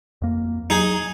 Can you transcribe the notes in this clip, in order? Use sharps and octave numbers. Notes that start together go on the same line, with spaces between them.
F2 A#3
F#3 D#4 G#4